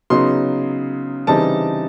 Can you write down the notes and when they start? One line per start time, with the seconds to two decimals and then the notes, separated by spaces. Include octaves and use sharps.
0.10 C#3 F#3 B3 D#4 C6
1.27 C#3 E3 G3 C4 D#4 A5